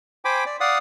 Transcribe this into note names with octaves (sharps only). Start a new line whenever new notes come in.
C5 G5 G#5 B5 D6
D5
D5 F5 F#5 D#6